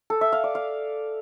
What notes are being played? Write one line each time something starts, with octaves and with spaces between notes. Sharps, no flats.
A4
E5
F5
D5
F5